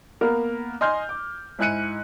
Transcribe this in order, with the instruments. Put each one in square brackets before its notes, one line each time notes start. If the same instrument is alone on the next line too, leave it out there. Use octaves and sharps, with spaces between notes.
[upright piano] A#3 B3 A#4
D#5 G#5 C6 F6 G6
D6
G#2 E4 G#5 F#6 C#7 D#7